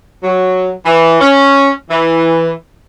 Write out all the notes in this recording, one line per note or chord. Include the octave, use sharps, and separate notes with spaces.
F#3
E3
C#4
E3